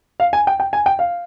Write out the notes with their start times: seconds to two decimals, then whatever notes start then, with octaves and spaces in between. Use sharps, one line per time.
0.20 F5
0.33 G#5
0.47 G5
0.60 G5
0.73 G#5
0.86 G5
0.99 F5